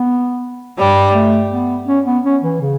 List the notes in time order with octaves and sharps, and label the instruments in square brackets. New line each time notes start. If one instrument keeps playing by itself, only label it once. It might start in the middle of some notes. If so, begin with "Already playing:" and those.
Already playing: [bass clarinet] B3
[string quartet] G2 G3
[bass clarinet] A3
B3
C#4
B3
C#4
E3
C#3